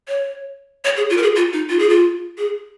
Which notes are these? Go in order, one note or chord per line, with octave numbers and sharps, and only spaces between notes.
C#5
C#5
G#4
F4
A#4
G#4
F4
D#4
F4
G#4
F4
G#4